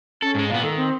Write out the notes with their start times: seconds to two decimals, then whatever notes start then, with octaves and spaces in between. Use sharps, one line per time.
0.22 C#4 A4
0.35 G#2 G#3
0.50 A#2 B3 F5
0.63 D#3 A4
0.77 C4